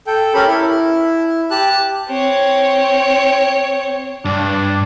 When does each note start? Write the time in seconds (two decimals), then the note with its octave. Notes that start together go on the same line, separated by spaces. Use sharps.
0.07 A4 G5
0.34 C#4 G4 A4 A#4 B5
0.47 E4
1.51 G4 A5 F#6
2.08 C4 C#5
4.25 G2 D4